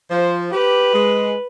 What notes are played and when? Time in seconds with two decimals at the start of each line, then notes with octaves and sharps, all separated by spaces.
0.10 F3 C5
0.51 G4 B4
0.93 G#3